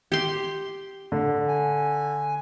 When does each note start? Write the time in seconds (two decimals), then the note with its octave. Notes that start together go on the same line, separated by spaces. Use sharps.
0.12 G4 C6
1.12 D3
1.48 G#5